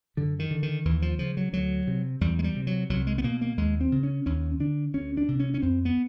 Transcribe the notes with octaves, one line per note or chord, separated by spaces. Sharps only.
F#2 D3
D#3
D3
D#3
D#2 E3
F3
C#3 F3
F#3
D2 F#3
C3
E2 G3
G#3
G3
C3
F#3
C2 F#3
G#3
B3
B2 A#3
A#3
D#2 G#3
C4
C#3
C#4
D#2 C#4
D3 D4
D2 C#4
D4
C3
C#4
C#4
F2 C4
B3